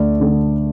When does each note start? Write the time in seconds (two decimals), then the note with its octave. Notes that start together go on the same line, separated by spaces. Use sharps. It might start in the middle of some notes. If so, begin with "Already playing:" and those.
Already playing: D2 D3 A3 D5
0.20 D3 A3